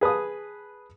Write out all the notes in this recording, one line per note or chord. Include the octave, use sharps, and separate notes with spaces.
G#4 B4 A5 D#6